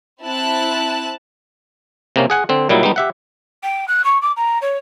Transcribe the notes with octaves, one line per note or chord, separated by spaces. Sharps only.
C4 E4 A5 F#6
C3 A#3 C#4
G#4 F#5 G#5
D3 C4
A#2 F#3 G3 D#4 E4
G3 G#3 B3 D#4
G4 E5 F#5
G5
F#6
C#6
D6
A#5
C#5